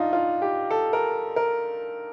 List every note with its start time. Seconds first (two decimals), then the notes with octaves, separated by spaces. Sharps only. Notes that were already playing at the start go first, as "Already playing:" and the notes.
Already playing: G2 D4 D#4 F4
0.13 F4
0.42 G4
0.70 A4
0.93 A#4
1.36 A#4